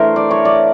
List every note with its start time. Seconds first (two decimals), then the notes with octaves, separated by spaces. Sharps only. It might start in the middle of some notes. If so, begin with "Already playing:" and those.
Already playing: E3 A3 D4 A#4 C5
0.16 D5
0.31 C#5
0.45 D5